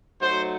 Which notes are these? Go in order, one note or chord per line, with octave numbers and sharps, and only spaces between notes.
F#3 A3 D#4 F#4 C5